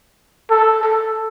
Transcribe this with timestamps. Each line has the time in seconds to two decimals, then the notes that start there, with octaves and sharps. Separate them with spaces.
0.50 A4
0.83 A4